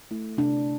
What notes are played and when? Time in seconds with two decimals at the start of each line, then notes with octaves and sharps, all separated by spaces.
0.11 A3 E4
0.37 C3 D4